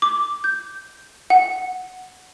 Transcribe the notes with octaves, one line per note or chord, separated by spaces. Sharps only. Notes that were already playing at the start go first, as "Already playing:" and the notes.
D6
G6
F#5